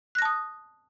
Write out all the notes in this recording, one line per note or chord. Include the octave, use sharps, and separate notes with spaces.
A5 D#6 F#6 A#6